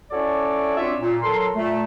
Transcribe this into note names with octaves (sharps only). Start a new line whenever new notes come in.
C#4 E4 F#4 A4 C#5 D5
C4 D4 F4 C#5 D5 E5
A#2
F#3 A4 A#4 C6
A#2 A3